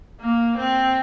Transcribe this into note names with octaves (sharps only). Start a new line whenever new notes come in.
A#3
C4